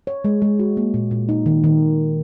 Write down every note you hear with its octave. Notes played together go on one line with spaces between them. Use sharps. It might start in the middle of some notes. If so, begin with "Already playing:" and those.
C#5
G#3
G#3
F#4
A#3
A#2
A#2
D#4
D#3
D#3